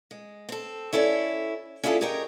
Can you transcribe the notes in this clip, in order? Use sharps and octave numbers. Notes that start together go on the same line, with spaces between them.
G#3
C4 A4
C#4 E4 A4 C#5 D5
C#4 D4 E4 F4 G#4 A4
G4 G#4 A#4 C#5 D#5 G5